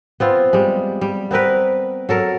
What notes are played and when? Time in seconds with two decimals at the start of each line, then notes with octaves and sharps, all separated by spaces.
0.20 B3 C4 F4
0.53 G3 G#3
1.01 G3
1.31 B3 C4 A#4 B4
2.09 F#3 A4 A#4